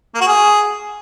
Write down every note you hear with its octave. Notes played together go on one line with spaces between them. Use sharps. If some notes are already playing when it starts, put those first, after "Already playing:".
A#3
F#4
G#4